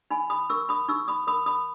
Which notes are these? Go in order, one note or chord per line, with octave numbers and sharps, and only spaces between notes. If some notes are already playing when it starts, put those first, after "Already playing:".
D#4 G#5 B5
B5 D#6
A#4 C#6 E6
B5 D#6
D#4 C#6 E6
B5 D#6
A#4 B5 D#6
B5 D#6